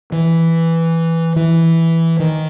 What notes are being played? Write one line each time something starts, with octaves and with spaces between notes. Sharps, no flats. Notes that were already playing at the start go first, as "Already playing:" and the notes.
E3
E3
D#3